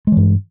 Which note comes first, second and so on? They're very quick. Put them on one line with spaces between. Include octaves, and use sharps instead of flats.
G#3 E3 G2